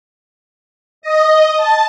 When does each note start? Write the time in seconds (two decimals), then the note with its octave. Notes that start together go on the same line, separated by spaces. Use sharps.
1.02 D#5
1.57 A5